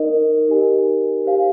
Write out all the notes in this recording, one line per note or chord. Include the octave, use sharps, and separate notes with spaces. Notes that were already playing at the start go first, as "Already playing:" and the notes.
Already playing: D#4 A#4 D#5
D#4 G4 A#4 D#5 G#5
G4 C5 F5 G#5